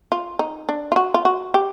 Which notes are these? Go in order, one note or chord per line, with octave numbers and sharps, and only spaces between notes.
F4
D#4
D4
F4
F#4
F4
F#4
G4